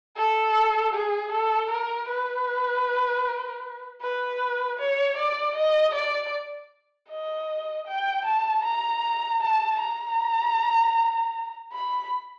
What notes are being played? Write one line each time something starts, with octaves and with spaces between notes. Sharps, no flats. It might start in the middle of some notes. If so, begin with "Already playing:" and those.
A4
G#4
A4
A#4
B4
B4
C#5
D5
D#5
D5
D#5
G5
A5
A#5
A5
A#5
B5